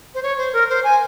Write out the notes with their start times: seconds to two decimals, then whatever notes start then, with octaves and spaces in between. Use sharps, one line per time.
0.15 C5
0.23 C#5
0.38 C5
0.53 A#4
0.70 C5
0.84 G#5